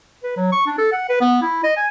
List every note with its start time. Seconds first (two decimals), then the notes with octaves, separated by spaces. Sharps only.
0.23 B4
0.37 F#3
0.52 C#6
0.66 D4
0.78 A4
0.92 F#5
1.09 B4
1.21 B3
1.42 E4
1.64 D#5
1.77 G#5